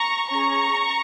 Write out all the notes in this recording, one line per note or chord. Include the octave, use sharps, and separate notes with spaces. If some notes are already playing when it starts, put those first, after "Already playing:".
Already playing: A#5 C#6
C#4 G#4 A#5 C#6